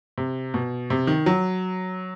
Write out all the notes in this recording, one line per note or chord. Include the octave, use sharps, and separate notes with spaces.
C3
B2
C3
D#3
F#3